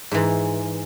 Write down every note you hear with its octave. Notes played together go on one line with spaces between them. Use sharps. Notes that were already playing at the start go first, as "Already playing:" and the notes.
G#2 E3